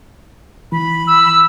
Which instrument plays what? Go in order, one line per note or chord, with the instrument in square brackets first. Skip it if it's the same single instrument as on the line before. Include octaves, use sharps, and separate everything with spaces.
[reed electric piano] E3 [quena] B5
[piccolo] E6